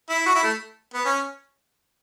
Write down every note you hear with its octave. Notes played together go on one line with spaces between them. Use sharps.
E4
F#4
E4
A3
B3
C#4